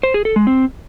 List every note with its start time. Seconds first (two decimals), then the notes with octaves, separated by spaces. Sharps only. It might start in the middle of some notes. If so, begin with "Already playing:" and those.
0.03 C5
0.14 G#4
0.25 A4
0.36 G#3
0.47 C4